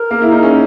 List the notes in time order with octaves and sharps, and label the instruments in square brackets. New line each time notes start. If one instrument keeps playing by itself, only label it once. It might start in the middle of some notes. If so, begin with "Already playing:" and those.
Already playing: [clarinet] A#4
[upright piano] A#3
E4
D#4
C#4